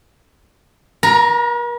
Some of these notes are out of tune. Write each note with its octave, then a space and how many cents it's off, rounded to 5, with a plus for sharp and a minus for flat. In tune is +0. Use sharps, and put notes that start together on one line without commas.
A#4 +45 A#5 +0